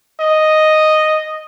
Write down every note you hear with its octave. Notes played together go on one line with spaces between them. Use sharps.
D#5